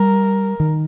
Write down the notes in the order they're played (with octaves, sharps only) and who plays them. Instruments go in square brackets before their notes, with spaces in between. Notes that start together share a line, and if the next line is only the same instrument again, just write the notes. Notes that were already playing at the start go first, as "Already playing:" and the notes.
Already playing: [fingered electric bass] G3 [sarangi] A#4
[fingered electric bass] D#3